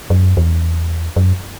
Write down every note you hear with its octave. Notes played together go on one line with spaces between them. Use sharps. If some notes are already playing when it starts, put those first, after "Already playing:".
F#2
E2
F#2